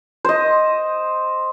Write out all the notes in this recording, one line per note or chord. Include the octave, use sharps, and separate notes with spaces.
C5 D#5